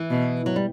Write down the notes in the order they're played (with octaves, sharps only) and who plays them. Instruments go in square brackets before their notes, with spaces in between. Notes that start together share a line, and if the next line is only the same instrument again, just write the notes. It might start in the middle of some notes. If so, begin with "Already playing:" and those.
Already playing: [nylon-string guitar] E3
[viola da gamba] B2
[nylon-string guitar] F#3
G3